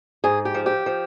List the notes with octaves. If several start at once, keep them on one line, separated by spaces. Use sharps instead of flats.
G#2 G#4
G4
F3
G4
F3